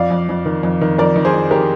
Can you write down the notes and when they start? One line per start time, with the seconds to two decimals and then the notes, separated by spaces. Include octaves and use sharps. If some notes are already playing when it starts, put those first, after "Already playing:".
Already playing: F2 D5 F5
0.10 F2
0.29 F2
0.45 D#3
0.63 F2
0.81 D#3
0.98 F2 A#4 D5
1.16 D#3
1.25 G#4 C5
1.34 F2
1.51 D#3 G4 A#4